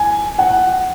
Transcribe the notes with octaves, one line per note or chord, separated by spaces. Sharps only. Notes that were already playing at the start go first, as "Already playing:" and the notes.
Already playing: G#5
F#5